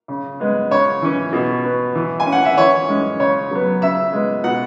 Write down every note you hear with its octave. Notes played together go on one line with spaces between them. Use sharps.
C#3
G#3 B3
C#3 C#5
E3 C#4
B2
B3
E3
G#5
C#4
F#5
E5
E3 C#5
G#3 C#4
C#3 C#5
F#3 B3
C#3 E5
G#3 B3
B2 F#5